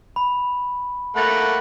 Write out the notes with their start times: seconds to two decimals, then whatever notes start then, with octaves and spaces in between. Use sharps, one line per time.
0.16 B5
1.16 A3 A#3 F#5 B5 A6 F7